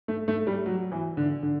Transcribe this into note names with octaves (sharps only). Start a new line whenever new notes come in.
A3
A3
G3
F#3
E3
D3
D3